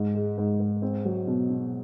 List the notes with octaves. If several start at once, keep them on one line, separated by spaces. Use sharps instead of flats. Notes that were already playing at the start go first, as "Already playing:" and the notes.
Already playing: G#2
G#3
G#2
G#2
C4
F#3
B2
B2